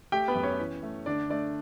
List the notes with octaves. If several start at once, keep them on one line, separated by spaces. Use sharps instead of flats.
A3 G4 G5
B3 B4
F#2
C#4 C#5
E3
A3
D3 D4 D5
A3 D4 D5